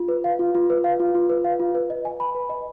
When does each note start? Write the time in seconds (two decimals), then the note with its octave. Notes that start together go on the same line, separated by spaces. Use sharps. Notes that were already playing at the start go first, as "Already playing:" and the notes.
Already playing: F4
0.08 B4
0.24 F5
0.39 F4
0.55 F4
0.70 B4
0.84 F5
1.00 F4
1.15 F4
1.29 B4
1.44 F5
1.60 F4
1.75 B4
1.90 D#5
2.05 G#5
2.20 B5
2.35 B4
2.49 D#5